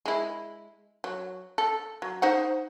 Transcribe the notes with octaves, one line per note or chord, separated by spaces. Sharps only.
G#3 E4
F#3
A4
F#3
D#4 C5 F#5